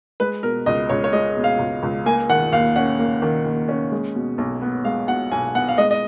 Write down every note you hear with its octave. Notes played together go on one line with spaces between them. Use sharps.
G#3 B4
B2 A#4
C#2 D#5
C#2 C#5
C#5
G#3 D#5
B2
F5
C#2
C#2
A#3 G#5
D#3 F#5
D#2 F5
C#4 F#5
A#3
D#3
D#2
C#4
G#3
B2
B1
B3
G#3 F5
B2 F#5
B1 G#5
B3 F#5
F5
G#3 D#5
D#5